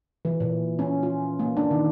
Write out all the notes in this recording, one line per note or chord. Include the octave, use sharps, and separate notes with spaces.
E3
A#2
C#4
F4
A#3
D4
D#3